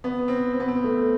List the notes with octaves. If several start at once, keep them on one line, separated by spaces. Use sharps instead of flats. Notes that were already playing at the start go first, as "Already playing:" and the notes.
B3
C4
C4
B3
C4
A3